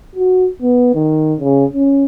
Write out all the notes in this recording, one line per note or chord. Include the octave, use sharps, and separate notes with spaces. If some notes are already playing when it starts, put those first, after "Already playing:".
F#4
B3
D#3
C#3
C#4